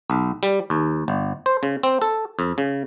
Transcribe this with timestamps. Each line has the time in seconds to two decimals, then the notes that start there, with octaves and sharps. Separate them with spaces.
0.10 B1
0.43 G3
0.70 D#2
1.08 G1
1.46 C5
1.63 C#3
1.83 C4
2.02 A4
2.39 F2
2.58 C#3